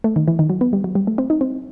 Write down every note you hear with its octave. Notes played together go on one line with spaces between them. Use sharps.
A3
D#3
E3
D#3
F#3
B3
G3
F#3
G3
A3
C4
D#4
C4